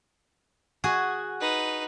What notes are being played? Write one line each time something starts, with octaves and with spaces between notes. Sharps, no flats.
F#4 G#4 G#5
D#4 B4